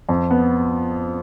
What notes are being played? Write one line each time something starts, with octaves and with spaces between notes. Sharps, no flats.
F2
B3